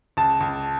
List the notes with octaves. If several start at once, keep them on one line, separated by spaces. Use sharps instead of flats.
C#2 A5
C#2